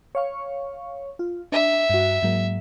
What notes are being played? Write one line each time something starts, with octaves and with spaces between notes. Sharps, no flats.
C#5 F5 C#6
F4
D4 E5
G2 F#4
G#2 F#3 A#3